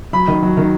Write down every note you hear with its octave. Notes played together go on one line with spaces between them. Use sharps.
F#3 B5
D#3
F#3
D#3